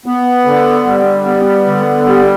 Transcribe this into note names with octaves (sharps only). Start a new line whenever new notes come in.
B3
D3
G3
B3
D3
G3